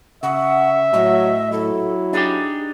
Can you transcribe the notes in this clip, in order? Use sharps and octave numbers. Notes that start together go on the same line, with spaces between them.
C#3 E5 F#5
A2 F#3 D#5
F#3 E4 A4
D4 D#4 G4 G#4